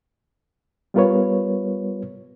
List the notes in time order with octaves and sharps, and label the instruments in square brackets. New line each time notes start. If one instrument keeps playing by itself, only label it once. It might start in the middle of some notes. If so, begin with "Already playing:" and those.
[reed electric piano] G3 B3 F4 A#4 B4 C#5